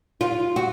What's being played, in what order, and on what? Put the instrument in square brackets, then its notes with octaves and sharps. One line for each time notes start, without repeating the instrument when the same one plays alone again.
[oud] F4
F#4